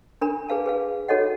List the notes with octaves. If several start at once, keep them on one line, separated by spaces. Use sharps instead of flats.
D4 A#4 B5
G#4 B4 F5 A5
G#4 B4 F5
D#4 F#4 A4 C#5 D#5 F#5